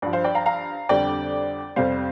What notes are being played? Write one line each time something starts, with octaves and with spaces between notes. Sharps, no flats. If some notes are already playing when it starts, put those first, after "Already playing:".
G2 F3 D5
C5 F5
D5 G5
F5 A#5
F5 A#5
F2 D3 G3 D5 G5
F2 C3 G3 C5 F5